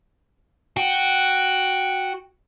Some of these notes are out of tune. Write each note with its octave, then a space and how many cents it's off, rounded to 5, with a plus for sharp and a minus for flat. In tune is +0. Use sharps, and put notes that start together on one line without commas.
F#4 +0 G5 +0